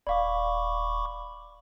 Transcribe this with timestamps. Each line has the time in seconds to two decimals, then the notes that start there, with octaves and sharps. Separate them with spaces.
0.07 D#1 D5 F5 B5 C#6 D6